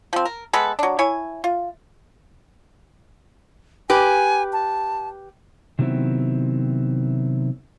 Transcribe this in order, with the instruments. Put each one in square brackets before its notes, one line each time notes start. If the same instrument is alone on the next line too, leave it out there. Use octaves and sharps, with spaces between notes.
[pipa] F3 C4
A#4
G#3 B3 A4 B4
F#3 D4
E4 C#5 G#5
F4
[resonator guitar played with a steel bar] G4 B4 [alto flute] G#5
[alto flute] A5
[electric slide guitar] C3 D#3 F#3 B3 C4 E4